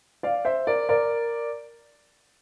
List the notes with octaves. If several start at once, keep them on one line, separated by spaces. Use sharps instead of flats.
D5 F5
C5 E5
A#4 D5
A#4 D5